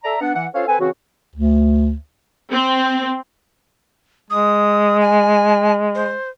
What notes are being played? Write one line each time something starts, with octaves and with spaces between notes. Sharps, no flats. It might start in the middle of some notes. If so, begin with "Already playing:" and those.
A4 D5 E5 A#5
B3 D4 F#5
E3 F#5
C#4 F4 A4 C5 F5
C4 A4 B4 G#5
C#3 E3 C4 F#4
D2
C4
G#3 D#6
G#5
C5